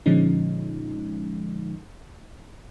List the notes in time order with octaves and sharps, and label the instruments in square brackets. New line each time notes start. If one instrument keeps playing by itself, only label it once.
[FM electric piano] A#2 D3 F3 G#3 C#4 D#4